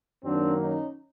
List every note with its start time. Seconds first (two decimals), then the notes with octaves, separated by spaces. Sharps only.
0.24 F#2 D#3 F#3 A#3 C4 D4
0.56 C#4 D#4